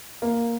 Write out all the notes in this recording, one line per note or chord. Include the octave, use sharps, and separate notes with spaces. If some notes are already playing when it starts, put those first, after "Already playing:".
A#3